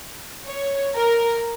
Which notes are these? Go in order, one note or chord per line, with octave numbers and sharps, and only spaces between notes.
C#5
A#4